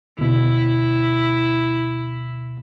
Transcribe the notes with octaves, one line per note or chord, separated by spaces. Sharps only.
D2 B2 E4